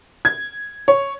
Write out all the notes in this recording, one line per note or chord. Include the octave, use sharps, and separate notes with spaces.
G#6
C#5